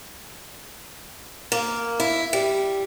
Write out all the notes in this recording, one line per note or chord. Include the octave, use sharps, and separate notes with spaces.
A#3
E4
G3